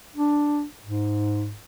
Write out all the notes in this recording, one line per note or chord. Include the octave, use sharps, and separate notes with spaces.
D4
G#2